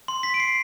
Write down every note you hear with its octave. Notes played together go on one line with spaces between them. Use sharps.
C6
B6
D7
C7